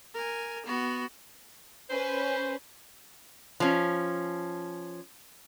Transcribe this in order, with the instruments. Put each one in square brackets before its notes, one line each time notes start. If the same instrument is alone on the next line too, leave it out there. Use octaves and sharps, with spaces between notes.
[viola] A#4 G#5
B3 F#4
[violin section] C#4 B4 [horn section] C5
[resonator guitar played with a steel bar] F3 C#4